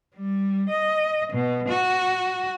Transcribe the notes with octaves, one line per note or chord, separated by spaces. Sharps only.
G3
D#5
B2
F#4